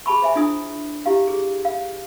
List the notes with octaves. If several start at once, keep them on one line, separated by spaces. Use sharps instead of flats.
G#4 A5 B5 C#6
C5 E5 G#5
D4 E4 F4 G#5 D#6
E4 G4 F5
G#4
F5